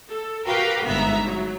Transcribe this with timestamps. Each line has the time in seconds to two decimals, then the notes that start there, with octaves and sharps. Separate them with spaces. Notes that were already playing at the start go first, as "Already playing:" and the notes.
0.10 A4
0.46 F#4 G4 A#4 B4 F5 G5
0.85 G1 G#2 B3 E5 A#5 B6
1.25 F#3